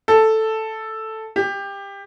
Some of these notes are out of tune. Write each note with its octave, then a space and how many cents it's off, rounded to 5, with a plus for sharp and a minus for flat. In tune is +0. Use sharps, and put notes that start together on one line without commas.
A4 +0
G4 +20